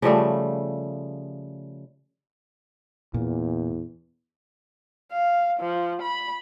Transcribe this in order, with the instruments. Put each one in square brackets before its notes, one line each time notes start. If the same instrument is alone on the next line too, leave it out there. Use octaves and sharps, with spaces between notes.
[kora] C#3 F3 G3 A3
[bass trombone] E2 [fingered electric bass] A#2
[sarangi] F5
F3
B5